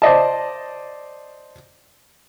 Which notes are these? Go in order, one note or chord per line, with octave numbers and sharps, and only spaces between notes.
C5 D5 D#5 A5